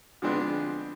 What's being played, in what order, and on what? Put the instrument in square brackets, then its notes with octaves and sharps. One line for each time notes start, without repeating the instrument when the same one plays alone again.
[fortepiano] D3 F3 G#3 B3 C4 D4